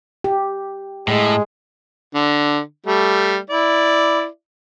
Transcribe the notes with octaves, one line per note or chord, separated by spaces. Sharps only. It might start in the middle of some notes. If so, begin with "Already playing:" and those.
G4
A2 G#3
D3
G3 A3
E4 D5